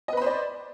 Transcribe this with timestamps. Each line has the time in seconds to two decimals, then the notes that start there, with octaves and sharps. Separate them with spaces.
0.08 D#5
0.13 B4
0.17 B5
0.22 C5
0.26 D5